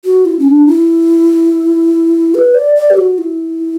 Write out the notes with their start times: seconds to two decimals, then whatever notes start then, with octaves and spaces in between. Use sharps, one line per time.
0.05 F#4
0.25 E4
0.39 C#4
0.47 D4
0.67 E4
2.35 B4
2.55 D5
2.75 D5
2.90 G4
2.97 F#4
3.18 E4